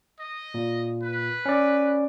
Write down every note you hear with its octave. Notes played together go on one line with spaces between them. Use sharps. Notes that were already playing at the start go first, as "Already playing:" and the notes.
D#5
A#2
B4
C#4 D5